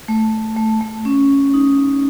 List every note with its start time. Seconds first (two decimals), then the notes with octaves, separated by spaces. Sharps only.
0.08 A3
0.56 A3
0.81 A3
1.05 C#4
1.54 D#4